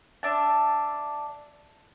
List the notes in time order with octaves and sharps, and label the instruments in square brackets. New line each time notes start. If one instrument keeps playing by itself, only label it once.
[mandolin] D4 E5 A5